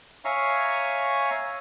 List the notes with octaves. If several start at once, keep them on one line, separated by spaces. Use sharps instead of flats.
C#5 E5 F5 G#5 A#5 C#6